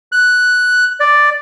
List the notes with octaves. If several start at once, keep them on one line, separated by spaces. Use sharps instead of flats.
F#6
D5